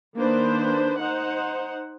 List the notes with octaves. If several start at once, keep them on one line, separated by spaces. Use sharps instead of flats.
D#3 A#3 D4 B4 C5
D#4 C5 F#5